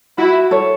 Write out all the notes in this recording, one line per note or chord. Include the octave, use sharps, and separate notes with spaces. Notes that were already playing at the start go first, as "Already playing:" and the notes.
E4 F#4
A4 C#5